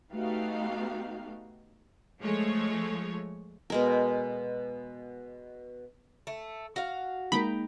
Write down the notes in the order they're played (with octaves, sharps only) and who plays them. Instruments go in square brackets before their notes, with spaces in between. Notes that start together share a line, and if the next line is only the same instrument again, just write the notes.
[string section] A3 B3 D#4 F#4 G4 F5
F3 G#3 A3 C#5
[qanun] B2 G#3 A#4
[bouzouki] A3
F#4 F5
[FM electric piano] G#3 A#3 [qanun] D#4 G5 A#5 [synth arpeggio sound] B5